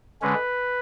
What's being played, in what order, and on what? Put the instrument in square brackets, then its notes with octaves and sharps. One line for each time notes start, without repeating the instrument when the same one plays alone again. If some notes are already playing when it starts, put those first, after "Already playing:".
[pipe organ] D3 G#3 C#4 B4